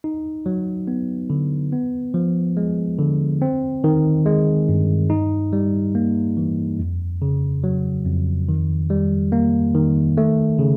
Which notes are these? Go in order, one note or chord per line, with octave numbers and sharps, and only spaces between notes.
D#4
F#3
B3
D3
B3
F3
G#3
D3
C4
D#3
G#3
G2
D#4
G3
A#3
E3
F2
C#3
F#3
F2
D#3
G3
A#3
D#3
A3
C#3